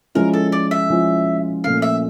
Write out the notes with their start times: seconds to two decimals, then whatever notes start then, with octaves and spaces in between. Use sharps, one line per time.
0.15 F3 G#3 C#4 E4 A#4
0.34 A4
0.52 D5
0.71 E5
0.90 F3 G#3 C#4 E4
1.64 A#2 F3 A3 C#4 F5
1.82 E5